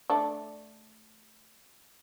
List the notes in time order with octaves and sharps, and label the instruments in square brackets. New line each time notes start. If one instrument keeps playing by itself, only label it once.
[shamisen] A3 D4